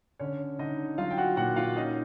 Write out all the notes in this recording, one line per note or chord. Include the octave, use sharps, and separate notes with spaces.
D3 C#4 C#5
D3 D#4 D#5
F#3 F4 F5
G5
F#4 F#5
A#2 F#4 F#5
F4 F5
C#4 D#4 D#5